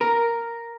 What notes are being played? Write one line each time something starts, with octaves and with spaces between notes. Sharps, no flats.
A#4